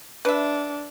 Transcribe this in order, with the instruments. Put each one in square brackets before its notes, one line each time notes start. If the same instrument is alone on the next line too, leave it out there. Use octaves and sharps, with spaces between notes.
[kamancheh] D4 [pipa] B4 E5